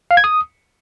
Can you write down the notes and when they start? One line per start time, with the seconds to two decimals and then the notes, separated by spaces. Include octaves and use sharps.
0.11 F5
0.17 G#6
0.24 D#6